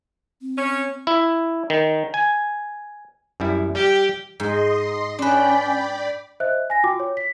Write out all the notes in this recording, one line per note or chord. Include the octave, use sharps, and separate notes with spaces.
C4
C#4
E4
D#3
G#5
F#2 G3 E4
G3 G4 G5
G#2 D#5 C6
C#4 D4 B4 D5 G5 B5
C5 D#5 E5 F#6
G#5 A#6
F4 F#4 G5 D6
C#5
B6